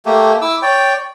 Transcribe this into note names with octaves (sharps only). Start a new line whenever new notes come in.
A3 A#3 G4
E4 D6 E6
C#5 D5 G5